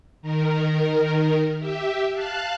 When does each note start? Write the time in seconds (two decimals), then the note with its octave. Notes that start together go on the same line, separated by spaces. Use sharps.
0.22 D#3 A#4
1.59 G4 E5
2.13 F5 A5 F#6